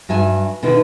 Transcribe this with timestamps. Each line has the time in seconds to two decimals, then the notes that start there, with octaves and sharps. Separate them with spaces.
0.09 G2 F#3 E5 G#5
0.63 B2 D3 D#3 E4 B4